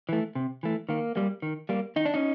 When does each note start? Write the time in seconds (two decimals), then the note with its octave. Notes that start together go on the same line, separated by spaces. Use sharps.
0.09 E3 A3
0.35 C3
0.63 E3 A3
0.89 D#3 A#3
1.16 G3 A#3
1.42 D#3
1.69 G3 A#3
1.96 D#3 D#4
2.05 D4
2.14 C#4 D#4